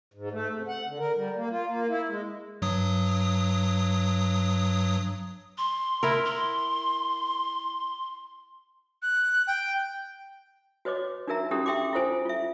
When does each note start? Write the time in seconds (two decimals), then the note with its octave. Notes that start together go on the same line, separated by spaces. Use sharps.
0.14 G#2
0.32 A3
0.54 C3
0.68 F#5
0.87 D3
0.99 A#4
1.15 G3
1.36 A#3
1.50 F4
1.66 A#3
1.89 E4
2.08 G#3
2.62 G2 F#3 D#6
5.58 C6
6.03 E4 A#4
6.25 C6
9.03 F#6
9.47 G5
10.85 F#4 B4 C#5 D#5 D6
11.28 D4 D#4 F#4 A#4 E5 A#5
11.51 C#4 D4 E4 F#4 G4 A4
11.66 G4 E5 G5 C6 D6
11.93 E4 F4 A4 C5 G#5
12.25 F4 E5